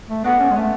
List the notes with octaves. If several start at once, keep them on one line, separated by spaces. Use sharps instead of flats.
A3
B3 D4 F#4 A4
C#4
G#3
A3 B3